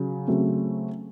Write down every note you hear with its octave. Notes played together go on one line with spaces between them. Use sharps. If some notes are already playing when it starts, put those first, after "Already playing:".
Already playing: C#3 F#3
C#3 F#3 A3 C4